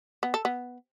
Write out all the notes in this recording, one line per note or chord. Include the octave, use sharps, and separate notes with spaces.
B3
A4
B3